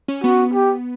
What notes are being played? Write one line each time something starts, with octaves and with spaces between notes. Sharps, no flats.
C#4
B3 F#4
G4